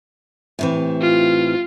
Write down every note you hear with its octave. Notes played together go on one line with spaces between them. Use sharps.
A2 C3 E3
F4